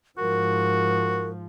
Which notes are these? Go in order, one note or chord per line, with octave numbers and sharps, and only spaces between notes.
G#2 F3 F#4 A#4